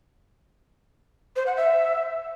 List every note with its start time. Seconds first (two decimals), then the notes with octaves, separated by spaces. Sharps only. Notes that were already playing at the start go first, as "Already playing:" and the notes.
1.36 C5
1.46 F#5
1.57 E5